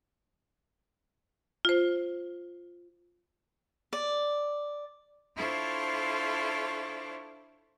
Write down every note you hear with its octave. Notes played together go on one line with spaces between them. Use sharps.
F4 C5
D5
D4 E4 F4 A4 C5 C#5